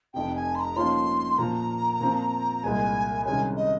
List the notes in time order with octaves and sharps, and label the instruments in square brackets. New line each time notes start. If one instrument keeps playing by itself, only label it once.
[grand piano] F1 F2 C3 [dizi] G5
[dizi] G#5
C6
A#5
[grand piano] G#2 F3 A#3 C#4 F4 [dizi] C6
[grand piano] A#2 F3 A#3 [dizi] A#5
[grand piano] A#2 F3 C4 F4
[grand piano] C2 A#2 G#3 [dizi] G#5
[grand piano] C2 C3 D#3 G#3 C#4 [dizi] G#5
[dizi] D#5